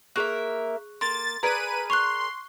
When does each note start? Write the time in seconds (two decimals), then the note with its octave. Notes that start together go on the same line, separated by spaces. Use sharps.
0.16 A#3 G#4 A#4 E5 C#6 F#6
1.01 A#3 C6 A6
1.43 G#4 A#4 B4 D5 A#5 G#6 D#7
1.90 C6 C#6 F#6 F7